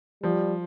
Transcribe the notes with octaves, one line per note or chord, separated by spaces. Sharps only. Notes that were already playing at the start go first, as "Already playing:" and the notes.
F3 G3